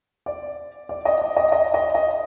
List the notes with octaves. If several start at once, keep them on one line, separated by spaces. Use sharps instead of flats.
D5
D5
D#5
D5
D#5
D#5
D#5
D#5